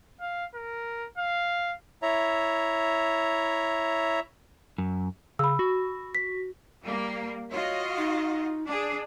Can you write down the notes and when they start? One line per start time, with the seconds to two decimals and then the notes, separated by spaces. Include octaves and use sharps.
0.21 F5
0.55 A#4
1.18 F5
2.02 E4 C#5 E5 A#5
4.78 F#2
5.39 C#3 B5 E6
5.59 F#4
6.15 B6
6.83 G3 A#3
7.51 F4 F#4 C#5 D#5
7.97 D#4
8.66 D4 G#4